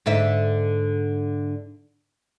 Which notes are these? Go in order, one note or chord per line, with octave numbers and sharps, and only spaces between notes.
G#2 D3 E5